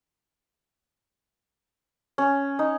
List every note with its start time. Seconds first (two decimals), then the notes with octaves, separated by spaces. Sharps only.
2.18 C#4
2.59 D#4